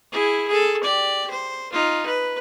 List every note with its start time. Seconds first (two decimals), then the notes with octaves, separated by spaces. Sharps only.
0.12 E4 G#4
0.48 G#4 A4
0.83 G4 D5
1.30 C5
1.72 D#4 F4
2.06 B4